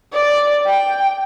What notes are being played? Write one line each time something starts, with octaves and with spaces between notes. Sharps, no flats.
D5
G5